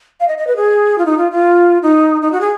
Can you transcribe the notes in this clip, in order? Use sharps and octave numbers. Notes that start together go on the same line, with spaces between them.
F5
D#5
D#5
B4
G#4
F4
D#4
F4
F4
D#4
D#4
F#4
G#4